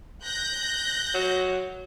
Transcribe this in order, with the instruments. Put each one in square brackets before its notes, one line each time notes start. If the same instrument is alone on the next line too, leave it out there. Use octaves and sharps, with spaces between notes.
[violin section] F#6 G6 A#6
[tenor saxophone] F#3